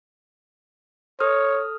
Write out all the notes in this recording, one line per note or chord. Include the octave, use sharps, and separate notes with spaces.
A4 C#5 D#6 F6